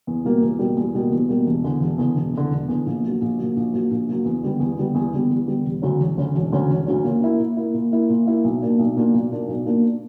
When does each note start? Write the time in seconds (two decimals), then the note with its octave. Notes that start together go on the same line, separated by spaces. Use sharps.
0.07 E2
0.24 B2 G3 A#3
0.41 E2
0.59 B2 G3 A#3
0.77 E2
0.94 B2 G3 A#3
1.11 E2
1.29 B2 G3 A#3
1.46 E1
1.64 E2 D3
1.81 E1
1.98 E2 D3
2.16 E1
2.33 E2 D3
2.51 E1
2.69 E2 D3
2.86 A#1
3.04 A#2 F#3
3.21 A#1
3.39 A#2 F#3
3.56 A#1
3.73 A#2 F#3
3.91 A#1
4.08 A#2 F#3
4.25 E2
4.43 D3 G3 B3
4.60 E2
4.78 D3 G3 B3
4.95 E2
5.13 D3 G3 B3
5.30 E2
5.48 D3 G3 B3
5.65 E1
5.82 D2 D3 F#3 C#4
6.00 E1
6.17 D2 D3 F#3 C#4
6.35 E1
6.52 D2 D3 F#3 C#4
6.69 E1
6.86 D2 D3 F#3 C#4
7.04 A#2
7.21 A#3 E4
7.39 A#2
7.57 A#3 E4
7.74 A#2
7.92 A#3 E4
8.09 A#2
8.26 A#3 E4
8.44 B1
8.62 A#2 A#3 D4
8.79 B1
8.96 A#2 A#3 D4
9.14 B1
9.31 A#2 A#3 D4
9.48 B1
9.66 A#2 A#3 D4